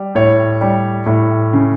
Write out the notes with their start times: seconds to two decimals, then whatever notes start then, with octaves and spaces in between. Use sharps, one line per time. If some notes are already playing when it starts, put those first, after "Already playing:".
Already playing: G3
0.15 A2 C#5
0.61 G3
1.06 A2
1.53 C#3